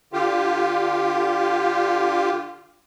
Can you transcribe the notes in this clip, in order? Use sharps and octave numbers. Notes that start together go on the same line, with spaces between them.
D3 F4 G4